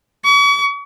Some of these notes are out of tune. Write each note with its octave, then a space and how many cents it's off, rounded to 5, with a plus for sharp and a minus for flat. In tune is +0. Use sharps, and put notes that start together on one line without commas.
C#6 +40